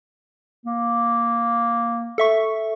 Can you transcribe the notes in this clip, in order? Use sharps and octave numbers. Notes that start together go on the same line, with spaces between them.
A#3
A4 E5 C#6